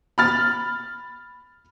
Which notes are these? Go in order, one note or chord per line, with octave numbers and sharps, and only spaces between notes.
B5 F6 A6